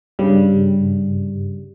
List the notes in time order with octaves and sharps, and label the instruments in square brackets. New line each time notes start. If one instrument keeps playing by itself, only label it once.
[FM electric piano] G2 C#3 G3